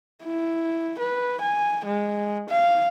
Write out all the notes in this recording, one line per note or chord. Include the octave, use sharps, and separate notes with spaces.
E4
B4
G#5
G#3
F5